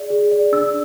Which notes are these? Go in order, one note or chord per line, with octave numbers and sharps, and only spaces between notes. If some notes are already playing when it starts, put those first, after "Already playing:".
Already playing: G#4 D5
G#4
D5
D4 E6